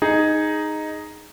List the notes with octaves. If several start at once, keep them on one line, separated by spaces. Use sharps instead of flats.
D#4 G#4